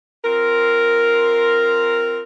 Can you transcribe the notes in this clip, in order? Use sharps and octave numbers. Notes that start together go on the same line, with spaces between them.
C4 F4 A#4